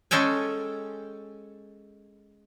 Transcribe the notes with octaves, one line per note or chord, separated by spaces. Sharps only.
G#3 C#4 A4 G5 G#5